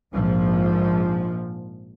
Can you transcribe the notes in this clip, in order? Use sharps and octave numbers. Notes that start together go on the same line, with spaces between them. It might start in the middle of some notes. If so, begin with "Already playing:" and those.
A#1 G#2 F3